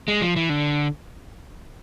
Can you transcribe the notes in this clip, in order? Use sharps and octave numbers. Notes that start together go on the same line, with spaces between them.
G#3
F3
E3
D3